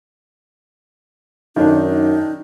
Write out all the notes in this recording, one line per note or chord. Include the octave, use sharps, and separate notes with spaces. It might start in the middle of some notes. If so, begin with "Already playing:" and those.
F#2 D#3 D4 D#4